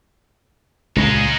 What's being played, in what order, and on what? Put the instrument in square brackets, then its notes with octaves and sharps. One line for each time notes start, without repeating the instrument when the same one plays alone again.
[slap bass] C#2 A#2 [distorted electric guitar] G#3 D#4